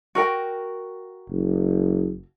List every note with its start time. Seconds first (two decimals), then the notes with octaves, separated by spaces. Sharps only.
0.15 F#4 A#4 G5
1.29 F#1